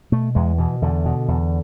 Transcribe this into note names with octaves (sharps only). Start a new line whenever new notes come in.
B2 A3
E2 G#3
B2 E3
E2 D3
B2
E2